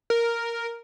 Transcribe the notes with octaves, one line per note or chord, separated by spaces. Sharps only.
A#4